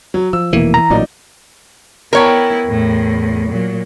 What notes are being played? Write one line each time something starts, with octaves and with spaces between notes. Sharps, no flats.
F#3
F3 E6
F1 B2 E3 A#3
A#5
A1 A#2 F#3 D#4 D5 D#5
B3 E4 A#4 C#5 G5
E2 A2
A#2 F#3